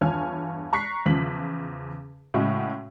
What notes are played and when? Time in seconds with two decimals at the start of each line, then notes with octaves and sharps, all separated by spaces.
0.01 E2 G2 F4 C#5 G#5 F6
0.73 A#5 C#6 F#6 B6 C7
1.06 E2 C#3 F3 B6 F#7
2.34 A2 C#3 G#3 F#4